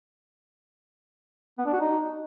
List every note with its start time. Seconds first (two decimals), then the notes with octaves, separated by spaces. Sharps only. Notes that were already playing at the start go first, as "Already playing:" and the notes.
1.58 B3
1.66 D4
1.73 F#4
1.80 D#4